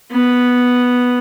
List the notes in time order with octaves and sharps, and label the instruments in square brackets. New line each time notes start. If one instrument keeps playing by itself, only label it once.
[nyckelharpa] B3